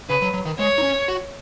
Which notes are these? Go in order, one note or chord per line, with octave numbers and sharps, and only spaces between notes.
C#3 B4
F#3
F#3
D#3
G#3 C#5
D#4
C#4
F#4